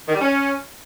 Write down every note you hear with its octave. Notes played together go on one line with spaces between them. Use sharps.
D#3
G3
C#4